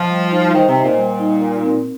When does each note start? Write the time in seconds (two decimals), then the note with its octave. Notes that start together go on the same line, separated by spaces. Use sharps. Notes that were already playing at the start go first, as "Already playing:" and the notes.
Already playing: F3 D#5
0.10 G3
0.32 D#4
0.54 D#3 C5
0.68 C3
0.76 D#5
0.83 A#2
0.98 G3
1.20 D#4
1.41 A#4
1.63 C4